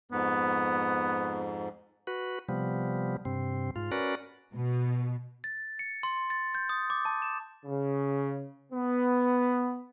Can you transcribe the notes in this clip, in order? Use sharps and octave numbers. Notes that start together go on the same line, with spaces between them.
F2 G#2 B3
F#4 B4
C3 F3 G3 B3
G2 C3 C4
G#2 F4
C#4 F#4 A#4 B4 D5
B2
A6
C#7
C6
A6
G6
D#6
D6
A5
E7
C#3
B3